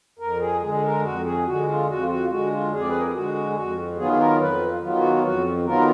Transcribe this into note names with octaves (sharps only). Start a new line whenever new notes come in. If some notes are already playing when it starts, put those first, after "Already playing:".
F2 A#4
G#4
D3 G#3 G#4
G#4
A#4
F2 F#4
G#4
D3 G#3 F#4
F4
F2 F#4
F4
F#4
F4
D3 G#3 F#4
F4
F2 G#4
D5
B4
A#4
G#4
D3 G#3 F#4
G#4
F2 F#4
D#3 F#3 B3 F4 G#4
G#4
A#4
F2 B4
F4
D#3 F#3 B3 F4
F#4
F2 F#4
D#3 F#3 B3 F4 A#4